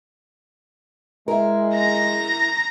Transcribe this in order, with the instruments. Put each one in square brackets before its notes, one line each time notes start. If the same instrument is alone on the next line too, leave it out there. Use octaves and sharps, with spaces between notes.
[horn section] G#3 [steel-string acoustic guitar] E4 A#4
[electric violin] A#5 A#6